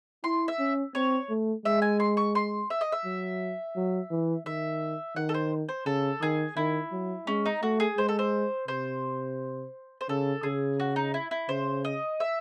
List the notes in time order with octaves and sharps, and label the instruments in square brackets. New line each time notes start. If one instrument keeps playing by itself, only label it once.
[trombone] E4 [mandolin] C6
[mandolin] E5
[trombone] C#4
[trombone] C4 [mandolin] C#5
[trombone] A3
[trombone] G#3 [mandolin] E5
[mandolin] G#5
C6
C#6
C6
E5
D#5
E5
[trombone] F#3
F#3
E3
[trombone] D#3 [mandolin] E5
[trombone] D#3 [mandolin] F#5
[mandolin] A4
C5
C5
[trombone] C#3 [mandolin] A4
[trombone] D#3 [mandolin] G#4
[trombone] D#3 [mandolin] E4
[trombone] F#3
[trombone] G#3 [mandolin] C#4
[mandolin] D#4
[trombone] A3 [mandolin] F#4
[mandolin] G#4
[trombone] G#3 [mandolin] C5
[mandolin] A4
C5
[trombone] C3 [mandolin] C5
[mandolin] C5
[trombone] C#3 [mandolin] A4
[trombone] C#3 [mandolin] G#4
[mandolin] F#4
D#4
E4
E4
[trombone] C#3 [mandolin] C5
[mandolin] D#5
E5